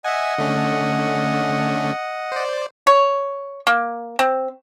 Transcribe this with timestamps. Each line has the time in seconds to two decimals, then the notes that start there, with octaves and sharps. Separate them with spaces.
0.04 D#5 E5 F#5 G#5
0.38 D3 A3 C#4
2.32 C5 D5
2.87 C#5
3.67 A#3
4.19 C4